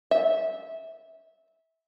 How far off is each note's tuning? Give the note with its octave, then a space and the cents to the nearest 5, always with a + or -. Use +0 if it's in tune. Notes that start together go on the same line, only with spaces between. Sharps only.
E5 -20